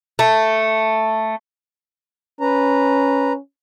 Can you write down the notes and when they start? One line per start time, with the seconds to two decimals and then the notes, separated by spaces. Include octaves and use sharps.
0.19 A3
2.41 C#4 B4 A#5